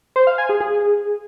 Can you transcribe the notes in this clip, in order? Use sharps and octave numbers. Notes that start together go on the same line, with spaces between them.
C5
F5
G#5
G#4
G#4